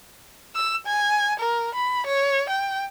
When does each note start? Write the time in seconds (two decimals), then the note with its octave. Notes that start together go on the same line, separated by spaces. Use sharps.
0.55 E6
0.86 G#5
1.39 A#4
1.75 B5
2.06 C#5
2.49 G5